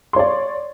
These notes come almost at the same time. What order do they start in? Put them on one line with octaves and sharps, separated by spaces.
C6 C#5 D5